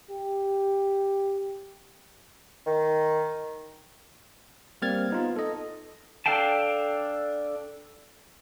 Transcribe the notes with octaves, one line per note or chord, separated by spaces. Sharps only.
G4
D#3
G3 A#3 C4 F6 G#6 A6
B3 D#4 F4
A4 D#5
D4 A4 F5 G5 A5